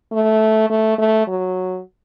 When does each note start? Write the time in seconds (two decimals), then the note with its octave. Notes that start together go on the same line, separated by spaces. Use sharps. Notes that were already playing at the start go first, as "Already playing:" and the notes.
0.12 A3
0.70 A3
0.98 A3
1.27 F#3